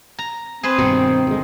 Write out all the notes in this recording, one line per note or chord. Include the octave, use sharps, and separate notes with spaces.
A#5
C4 G#4 B4 C5
G2 B2 D#3
D2 G#3